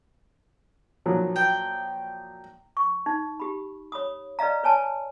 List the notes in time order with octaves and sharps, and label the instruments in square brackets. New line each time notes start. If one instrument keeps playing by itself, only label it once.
[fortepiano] A#2 F3 F#3
[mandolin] G5
[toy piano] C#6
D#4
G4 B5
C#5 B5 D#6
B4 D5 D#5 F5 A#5
B4 C#5 G#5 A5